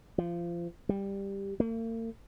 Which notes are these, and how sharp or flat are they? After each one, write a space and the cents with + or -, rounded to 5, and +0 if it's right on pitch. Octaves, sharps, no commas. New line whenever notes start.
F3 -25
G3 +10
A#3 -45